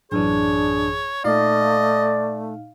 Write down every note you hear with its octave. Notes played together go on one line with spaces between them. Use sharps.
A1 F#2 E3 D4 G#4 C#5
A#2 A3 D#4 D5 D#5 F5